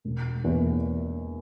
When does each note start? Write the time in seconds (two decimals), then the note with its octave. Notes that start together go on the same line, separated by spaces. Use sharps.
0.05 E1
0.44 E2 E3 A#3